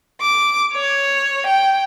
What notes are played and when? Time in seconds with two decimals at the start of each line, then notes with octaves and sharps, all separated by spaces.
0.21 D6
0.73 C#5
1.46 G5